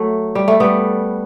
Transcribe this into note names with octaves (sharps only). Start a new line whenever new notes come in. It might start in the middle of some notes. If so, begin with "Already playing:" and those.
Already playing: F#3 A3
G3
A3
G3 B3